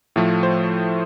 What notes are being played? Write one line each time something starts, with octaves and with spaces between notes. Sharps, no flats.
A2 F3 A3
C5